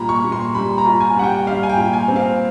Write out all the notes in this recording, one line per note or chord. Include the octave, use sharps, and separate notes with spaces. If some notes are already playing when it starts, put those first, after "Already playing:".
Already playing: A#2 G3 A#5 B5
C#6
A#2
C6
G3 B5
A#5
F4
G#5
G3 F#5
G5
G3 F5
G#5
G5
A#2
G#5
C4
F5